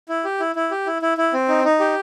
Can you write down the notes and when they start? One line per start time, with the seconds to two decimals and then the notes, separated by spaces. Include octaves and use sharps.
0.09 E4
0.25 G4
0.40 E4
0.55 E4
0.71 G4
0.86 E4
1.02 E4
1.18 E4
1.33 C4
1.48 D#4
1.64 D#4
1.80 G4